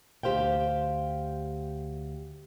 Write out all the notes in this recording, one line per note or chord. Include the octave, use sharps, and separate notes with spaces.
D2 G4 C5 F5 G5